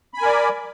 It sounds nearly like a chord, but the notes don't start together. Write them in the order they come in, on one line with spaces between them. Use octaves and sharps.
B5 G#5 A#4 D5